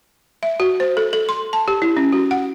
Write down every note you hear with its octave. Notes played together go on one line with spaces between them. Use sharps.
E5
F#4
C5
A4
A4
C6
A5
G4
E4
C#4
F#4
F#5